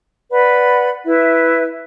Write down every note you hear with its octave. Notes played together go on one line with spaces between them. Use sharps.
B4 D5 F#5 B5
E4 B4 E5